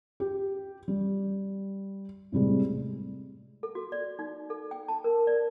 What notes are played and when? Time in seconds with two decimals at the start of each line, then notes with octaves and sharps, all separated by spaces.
0.20 G4
0.88 G3
2.32 A2 C3 G3 G#3
3.63 A4
3.75 F#4
3.92 D5
4.19 D#4
4.50 A4
4.71 G5
4.88 A5
5.04 A#4
5.27 D5